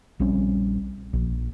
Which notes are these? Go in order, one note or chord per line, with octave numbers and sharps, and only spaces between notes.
A#1 G3 C4 C#4
A#1